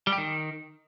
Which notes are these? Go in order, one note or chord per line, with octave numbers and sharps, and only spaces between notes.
G3
G4
D#3